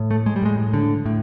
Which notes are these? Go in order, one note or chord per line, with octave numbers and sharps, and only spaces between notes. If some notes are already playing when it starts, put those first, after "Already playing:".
Already playing: A2
A3
G#3
G3
A2 G#3
D3
A2